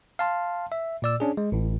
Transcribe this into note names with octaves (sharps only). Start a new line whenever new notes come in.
F5 A5 C6
E5
A#2 D5 E6
C#4 D4 G#4
G#3
A1 A2